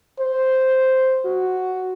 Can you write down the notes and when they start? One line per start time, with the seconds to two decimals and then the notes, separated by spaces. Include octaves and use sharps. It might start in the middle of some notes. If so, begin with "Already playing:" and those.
0.19 C5
1.25 F#4